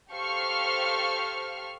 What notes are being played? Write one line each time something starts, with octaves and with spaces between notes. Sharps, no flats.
G4 A4 C5 F5 C#6 F6